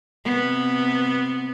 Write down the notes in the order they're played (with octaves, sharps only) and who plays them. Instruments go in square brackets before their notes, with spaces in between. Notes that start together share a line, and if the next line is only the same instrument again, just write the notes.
[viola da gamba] C3 B3